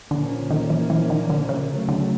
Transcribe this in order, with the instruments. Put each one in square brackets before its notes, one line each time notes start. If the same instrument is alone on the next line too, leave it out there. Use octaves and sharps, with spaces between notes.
[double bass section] A#2 F3 A#3 C#4 [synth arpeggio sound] D3
[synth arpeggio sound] D#3
E3
E3
D#3
D3
C#3
[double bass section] C#3 F#3 A3
[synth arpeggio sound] D3